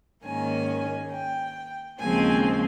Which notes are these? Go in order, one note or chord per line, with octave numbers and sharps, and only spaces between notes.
G#2 D#3 A#3 C#4 G#5
G5
D#2 C#3 F3 G#3 C4 G#5